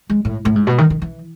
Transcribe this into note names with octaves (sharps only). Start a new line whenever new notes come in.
G#3
A2
A2
G#2
B2
D#3
D#3
E3